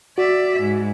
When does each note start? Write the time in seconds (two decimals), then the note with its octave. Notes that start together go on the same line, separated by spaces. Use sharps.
0.18 F#4 D5 E5
0.61 G#2